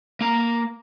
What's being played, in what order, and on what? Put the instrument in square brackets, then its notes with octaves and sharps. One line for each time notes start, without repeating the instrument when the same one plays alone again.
[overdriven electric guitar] A#3 A#5